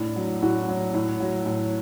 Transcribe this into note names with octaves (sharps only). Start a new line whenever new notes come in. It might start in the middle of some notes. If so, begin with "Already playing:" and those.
Already playing: A2 D4
F#3
A2 F#4
F#3
A2
F#3
A2